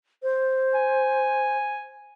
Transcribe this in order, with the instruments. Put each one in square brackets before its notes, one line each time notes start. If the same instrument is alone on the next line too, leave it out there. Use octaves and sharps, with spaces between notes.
[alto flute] C5
[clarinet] G#5